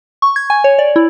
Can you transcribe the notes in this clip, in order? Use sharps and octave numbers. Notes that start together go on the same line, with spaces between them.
C#6
G#6
G#5
C#5
D5
E4